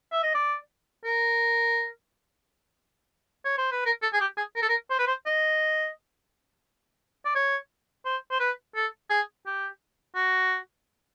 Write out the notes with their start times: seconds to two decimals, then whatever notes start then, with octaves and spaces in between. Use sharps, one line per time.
0.12 E5
0.23 D#5
0.34 D5
1.04 A#4
3.45 C#5
3.58 C5
3.72 B4
3.86 A#4
4.02 A4
4.13 G#4
4.21 G4
4.37 G#4
4.56 A#4
4.62 A4
4.69 A#4
4.90 C5
4.99 B4
5.07 C5
5.26 D#5
7.25 D5
7.35 C#5
8.05 C5
8.31 C5
8.40 B4
8.76 A4
9.10 G#4
9.46 G4
10.15 F#4